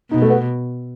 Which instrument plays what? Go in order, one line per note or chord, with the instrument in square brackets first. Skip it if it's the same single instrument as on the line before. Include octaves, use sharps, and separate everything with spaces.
[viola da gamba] B2 [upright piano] D#4
[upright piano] A3
B3